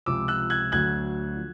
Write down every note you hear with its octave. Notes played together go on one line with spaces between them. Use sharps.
C#2 C3 F3 D6 E6
E6 F#6
F#6 G#6
D2 D3 F#3 F#6 G#6
F3